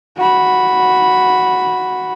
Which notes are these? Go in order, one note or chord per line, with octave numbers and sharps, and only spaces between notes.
F#4 B5